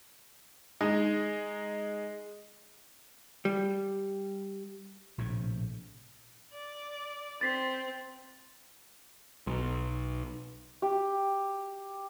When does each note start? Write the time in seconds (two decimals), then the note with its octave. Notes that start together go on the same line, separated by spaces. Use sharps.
0.81 G#3 D#4
3.45 G3
5.18 A#1 A2 C3
6.53 D5
7.41 C4 A6 B6 C7
9.47 B1
10.82 G4